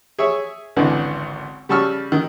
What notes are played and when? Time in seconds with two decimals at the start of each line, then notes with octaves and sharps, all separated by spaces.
0.19 G#4 C#5 E5
0.76 G#1 C#2 D3 E3 D4
1.69 C#3 G3 A5 C#6 E6 F6
2.12 D#3